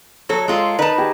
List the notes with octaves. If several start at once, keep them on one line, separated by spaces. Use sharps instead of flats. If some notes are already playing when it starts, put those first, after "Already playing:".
F#3 A4 C#5 A#5
G#3 F4 A4
D#4 A#4 B4 D#5 A5
G4 G#4